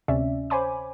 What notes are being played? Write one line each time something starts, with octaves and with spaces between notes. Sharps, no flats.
D2 C3 C#4 D5 E5
C5 C#5 G#5 B5 D6